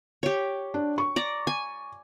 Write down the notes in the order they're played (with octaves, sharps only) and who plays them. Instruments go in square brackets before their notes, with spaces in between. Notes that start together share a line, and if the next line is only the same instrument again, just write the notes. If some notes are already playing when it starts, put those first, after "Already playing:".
[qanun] G4 C#5
[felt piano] D4
C#6
[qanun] D5 A#5
G#5